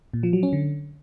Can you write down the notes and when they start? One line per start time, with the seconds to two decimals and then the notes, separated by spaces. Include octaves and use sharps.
0.14 A#2
0.23 F3
0.33 F#3
0.43 C#4
0.53 D3